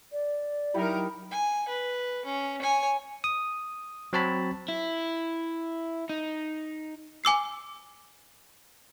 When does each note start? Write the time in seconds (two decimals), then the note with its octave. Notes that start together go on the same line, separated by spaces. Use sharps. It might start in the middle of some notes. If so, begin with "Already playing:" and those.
0.12 D5
0.74 F#3 D#4 E4 G4 A#4 B5
1.31 G#5
1.68 B4
2.26 C#4
2.62 C#5 G#5
3.24 D#6
4.13 F#3 C4 C#5 A5 B5
4.68 E4
6.09 D#4
7.24 G#5 D6 E6 C7